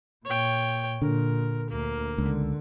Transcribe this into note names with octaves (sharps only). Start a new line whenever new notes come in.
A#2 C#5 G5
A#2 D3 A#4
D2 A#3
C#2 D3